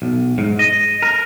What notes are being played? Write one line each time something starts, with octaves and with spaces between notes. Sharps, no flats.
B1
G#2
D#5
A#4